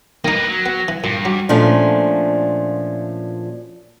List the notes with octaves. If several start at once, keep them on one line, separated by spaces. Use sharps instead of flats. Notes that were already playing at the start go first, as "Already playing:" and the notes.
D#3 A#3 D#4 B4 A#6
F#3
B3
E3
G2 A#2 A#6
F#3 D6
A#2 F3 A3 C#4 D4